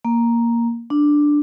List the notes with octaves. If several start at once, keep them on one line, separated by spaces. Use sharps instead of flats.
A#3
D4